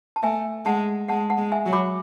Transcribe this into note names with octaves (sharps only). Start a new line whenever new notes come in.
A5
A3 E5 G#5
G#3 F#5 A5
G#3 F#5 A5
F#5 A5
G#3
E5 G#5
F#3
B5 D6